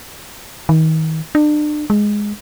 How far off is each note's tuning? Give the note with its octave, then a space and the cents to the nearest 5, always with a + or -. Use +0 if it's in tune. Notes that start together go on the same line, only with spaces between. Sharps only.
D#3 +35
D4 +35
G#3 +0